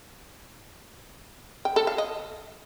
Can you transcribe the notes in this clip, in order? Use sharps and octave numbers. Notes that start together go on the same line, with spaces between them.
G5
A4
F5
D#5